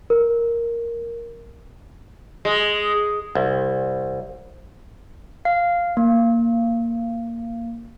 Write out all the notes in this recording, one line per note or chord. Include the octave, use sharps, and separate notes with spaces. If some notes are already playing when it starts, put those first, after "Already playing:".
A#4
G#3
C2
F5
A#3